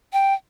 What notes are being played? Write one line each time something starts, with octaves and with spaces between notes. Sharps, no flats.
G5